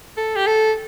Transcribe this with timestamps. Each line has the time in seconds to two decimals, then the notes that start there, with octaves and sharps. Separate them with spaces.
0.17 A4
0.35 G4
0.46 A4